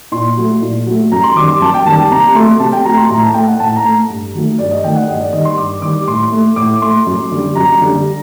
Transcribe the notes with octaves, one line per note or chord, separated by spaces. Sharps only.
A#2 C6
F#3 A3
A#2
F#3 A3
F#2 A#5
C6
D#3 G3 D6
C6
F#2 A5
G5
D#3 G3 A5
A5
C3 A#5
F#3 A3 C6
C3 A5
G5
F#3 A3 A#5
C6
A2 A#5
A5
A3 G5
F#5
A2 A5
A#5
A3
G2
D#3 F#3 A3
G2 D5
D#5
D#3 F#3 A3 G5
F#5
G2 D#5
D5
D#3 G3 D#5
C6
G2 D6
D#3 G3 D6
A2 C6
A3
A2 D6
A3 C6
F#2
D3 G3
F#2 A#5
D3 G3